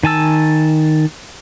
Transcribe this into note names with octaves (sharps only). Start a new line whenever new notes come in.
D#3 G#5 A5 E6